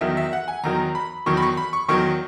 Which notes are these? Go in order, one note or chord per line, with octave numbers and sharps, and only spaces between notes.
E2 D#3 F#3 E5
E5
F#5
G#5
E2 D#3 F#3 A#5
B5
E2 D#3 F#3 C#6
B5
C#6
B5
C#6
E2 D#3 F#3 C#6